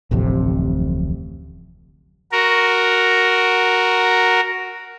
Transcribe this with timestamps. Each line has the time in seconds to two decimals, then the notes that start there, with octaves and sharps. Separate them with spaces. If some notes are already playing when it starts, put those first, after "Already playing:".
0.11 D1 A1 F2 C3
2.32 F#4 A#4